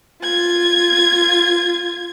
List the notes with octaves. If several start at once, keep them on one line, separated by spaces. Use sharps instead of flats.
F4 G#6